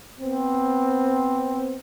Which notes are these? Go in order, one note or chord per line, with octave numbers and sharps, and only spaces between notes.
B3 C4